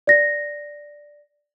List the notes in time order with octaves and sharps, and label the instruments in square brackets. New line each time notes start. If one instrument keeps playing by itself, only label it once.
[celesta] D5 A#6